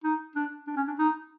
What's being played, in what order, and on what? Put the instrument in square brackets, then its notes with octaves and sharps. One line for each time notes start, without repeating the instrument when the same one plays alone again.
[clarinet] D#4
D4
D4
C#4
D4
D#4